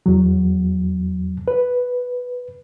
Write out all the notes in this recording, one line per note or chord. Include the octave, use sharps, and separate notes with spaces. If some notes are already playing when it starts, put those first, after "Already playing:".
E2 F#3
B4